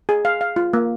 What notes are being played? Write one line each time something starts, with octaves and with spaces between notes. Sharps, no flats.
G#4
F5
F5
F4
A#3